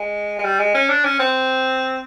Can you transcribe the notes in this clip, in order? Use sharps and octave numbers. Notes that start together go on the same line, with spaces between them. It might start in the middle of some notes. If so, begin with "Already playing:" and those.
Already playing: G#3
G#3
G3
G#3
C#4
D4
C#4
C4